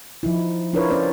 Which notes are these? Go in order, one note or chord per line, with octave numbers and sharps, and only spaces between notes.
F3 D#4 E4
D4 E4 F4 A#4 B4 C#5
C#4 F4 C5 D5